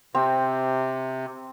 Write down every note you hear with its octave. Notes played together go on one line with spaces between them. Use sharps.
C3 C4